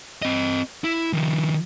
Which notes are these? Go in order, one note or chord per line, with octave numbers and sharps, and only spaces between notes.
C4 D#5
E4
D#3 F3